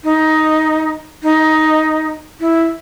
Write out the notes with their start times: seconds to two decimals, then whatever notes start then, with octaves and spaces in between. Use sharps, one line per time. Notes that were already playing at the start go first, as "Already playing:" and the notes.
0.04 D#4
1.23 D#4
2.40 E4